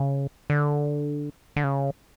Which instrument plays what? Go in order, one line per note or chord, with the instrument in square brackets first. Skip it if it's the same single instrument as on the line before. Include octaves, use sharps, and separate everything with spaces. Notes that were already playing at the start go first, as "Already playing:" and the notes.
Already playing: [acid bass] C#3
D3
D3
C#3